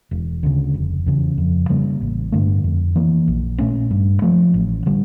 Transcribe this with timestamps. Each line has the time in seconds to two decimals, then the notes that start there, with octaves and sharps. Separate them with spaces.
0.11 E1
0.43 D2 C#3
0.74 F1
1.06 E2 C#3
1.38 F2
1.69 C#3 G3 A#3
2.01 A1
2.32 G2 D3 A3
2.64 F2
2.96 E3 A#3
3.28 A#1
3.59 A#2 A3 C#4
3.91 G2
4.22 F3 A3
4.54 A1
4.86 D3 G3